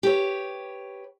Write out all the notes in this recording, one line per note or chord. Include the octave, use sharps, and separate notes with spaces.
G4 B4 C#5